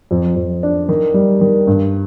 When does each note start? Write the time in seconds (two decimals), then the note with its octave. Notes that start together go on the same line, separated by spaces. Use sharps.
0.11 F2
0.36 F2
0.63 D4
0.89 D#3
1.14 G3
1.41 D#3
1.67 G2